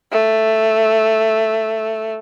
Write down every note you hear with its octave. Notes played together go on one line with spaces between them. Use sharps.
A3